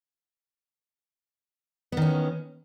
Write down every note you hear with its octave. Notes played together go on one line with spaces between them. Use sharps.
D#3 B3 C#4